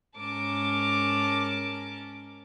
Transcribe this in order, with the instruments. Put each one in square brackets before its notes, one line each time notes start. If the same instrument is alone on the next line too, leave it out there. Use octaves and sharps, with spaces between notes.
[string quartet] G#2 C#4 A#4 A5 D6